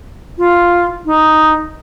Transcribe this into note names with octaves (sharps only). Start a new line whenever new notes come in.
F4
D#4